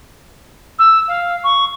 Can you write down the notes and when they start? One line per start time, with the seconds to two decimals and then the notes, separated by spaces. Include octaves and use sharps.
0.79 E6
1.08 F5
1.43 C#6